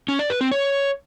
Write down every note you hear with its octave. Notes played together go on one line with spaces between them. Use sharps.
C#4
D5
B4
C4
C#5